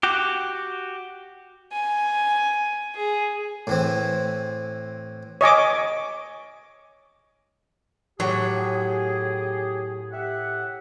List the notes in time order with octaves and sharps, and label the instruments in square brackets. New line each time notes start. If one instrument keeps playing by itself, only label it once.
[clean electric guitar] F#4 G4
[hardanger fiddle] G#5
G#4
[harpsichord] A2 E3 C4
[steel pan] C#5 D#5 G#5 D6
[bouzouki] A2 [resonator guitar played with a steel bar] F#3 [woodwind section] G4 G#4
[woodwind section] G4 E5 F#5